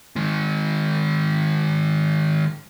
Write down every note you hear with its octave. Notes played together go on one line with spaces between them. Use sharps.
D#3 G#3